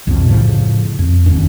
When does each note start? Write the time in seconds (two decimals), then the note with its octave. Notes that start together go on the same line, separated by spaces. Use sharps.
0.07 B1 F2 B2
0.28 A2 C#3 F3
0.99 F2
1.26 F1 D#2 C#4